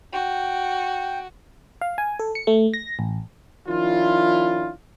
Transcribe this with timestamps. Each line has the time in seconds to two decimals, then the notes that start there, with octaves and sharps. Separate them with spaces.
0.13 F#4 G5
1.81 F5
1.98 G#5
2.19 A4
2.35 C#7
2.47 A3
2.74 A#6
2.99 A1
3.68 D#3 F3 C#4 D4 E4 F4